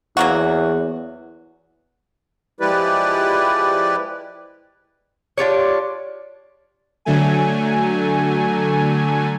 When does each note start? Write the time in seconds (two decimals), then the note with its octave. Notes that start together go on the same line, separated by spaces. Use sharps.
0.17 E2 F#3 A#3 F#4
2.60 F3 G#3 E4 G4 B4 D5
5.38 D4 F4 G4 C#5
7.05 D3 F#3 A3 G#5